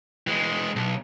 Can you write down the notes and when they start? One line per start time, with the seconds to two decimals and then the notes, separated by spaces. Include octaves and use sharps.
0.27 E3 G#3
0.76 B1